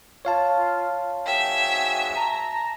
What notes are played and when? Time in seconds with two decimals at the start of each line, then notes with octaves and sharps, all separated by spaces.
0.25 F4 C#5 F5 A5
1.26 G#2 F#4 E5 G5 G#5
2.16 A5 A#5